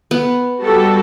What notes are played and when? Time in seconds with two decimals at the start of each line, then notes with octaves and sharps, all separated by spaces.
0.11 B3
0.62 G3 F#4 A4